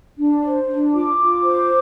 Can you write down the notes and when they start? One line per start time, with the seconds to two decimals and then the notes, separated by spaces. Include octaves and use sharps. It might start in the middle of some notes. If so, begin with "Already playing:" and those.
0.17 D4
0.43 C5
0.68 D4
0.93 F4 D6
1.18 F4
1.44 C5